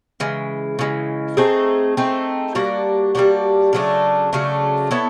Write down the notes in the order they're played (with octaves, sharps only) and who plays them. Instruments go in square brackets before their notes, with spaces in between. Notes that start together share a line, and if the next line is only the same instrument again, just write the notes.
[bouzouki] C#3 E3 G#3
C#3 E3 G#3
A3 C4 D#4 G#4
A3 C4 D#4 G#4
G3 A#3 D4 F#4
G3 A#3 D4 F#4
C#3 F#3 A3 D4
C#3 F#3 A3 D4
B3 E4 A4 C#5